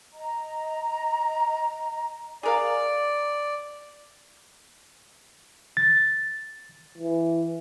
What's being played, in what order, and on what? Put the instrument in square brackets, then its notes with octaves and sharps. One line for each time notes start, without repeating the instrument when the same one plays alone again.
[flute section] D#5 A#5
[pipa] G#4 A#4 F5 [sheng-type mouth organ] D5
[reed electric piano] A6
[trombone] E3